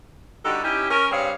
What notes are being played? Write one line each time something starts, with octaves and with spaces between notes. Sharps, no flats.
D3 G3 D#4 F#4 G4 A4
C#4 D#4 E4 G4
C#4 A#4
G2 G3 C4 G#4 C#5 F5